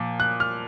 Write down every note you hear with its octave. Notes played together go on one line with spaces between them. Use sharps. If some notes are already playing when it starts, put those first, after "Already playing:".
Already playing: A#2 F3
F#6
F6